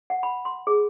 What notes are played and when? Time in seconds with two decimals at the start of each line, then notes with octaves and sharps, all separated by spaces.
0.10 F#5
0.23 B5
0.45 C6
0.67 G#4